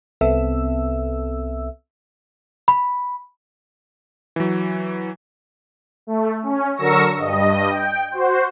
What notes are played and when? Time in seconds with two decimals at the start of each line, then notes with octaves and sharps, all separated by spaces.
0.21 C2 B3 C4 A4 E5 E6
2.68 B5
4.36 E3 F#3
6.07 A3
6.43 C#4
6.77 D3 F#3 A#4 C#6 E6 A#6
7.17 G2 D#5
7.70 G5
8.12 F#4 C5